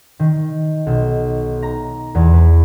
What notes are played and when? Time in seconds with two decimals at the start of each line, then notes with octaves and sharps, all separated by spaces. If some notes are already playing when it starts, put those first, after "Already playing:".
0.19 D#3
0.86 B1
1.62 A#5
2.15 E2
2.33 B4